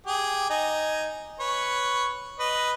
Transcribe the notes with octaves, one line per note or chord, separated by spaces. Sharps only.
G4 G#4
D#4 G#5
B4 C#5
B4 D#5